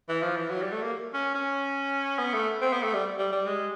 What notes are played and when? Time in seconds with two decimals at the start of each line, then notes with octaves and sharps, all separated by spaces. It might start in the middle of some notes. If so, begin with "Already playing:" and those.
0.09 E3
0.23 F3
0.37 E3
0.50 F#3
0.62 G3
0.72 A3
0.82 A#3
1.14 C#4
1.35 C#4
2.19 B3
2.34 A3
2.62 C4
2.73 B3
2.83 A3
2.94 G3
3.18 G3
3.32 G3
3.47 G#3